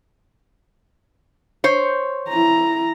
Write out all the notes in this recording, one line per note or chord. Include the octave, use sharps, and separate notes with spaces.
C5 C#5
E4 A#5